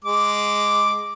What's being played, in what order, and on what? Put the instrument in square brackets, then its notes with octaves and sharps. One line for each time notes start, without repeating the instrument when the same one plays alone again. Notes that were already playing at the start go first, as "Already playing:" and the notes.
[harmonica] G#3 D6